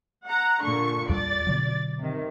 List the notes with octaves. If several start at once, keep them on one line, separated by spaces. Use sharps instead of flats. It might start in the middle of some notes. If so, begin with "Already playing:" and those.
F#5 A#5
A#2 D3 C#6
E2 G3 D5 A6
B2 D3 F#3
C3 D#3